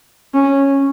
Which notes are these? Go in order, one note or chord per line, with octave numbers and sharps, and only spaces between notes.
C#4